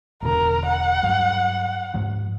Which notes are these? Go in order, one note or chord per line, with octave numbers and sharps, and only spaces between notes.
E1 B2 D3 A#4
F#5
G2 F#3
G#2 F3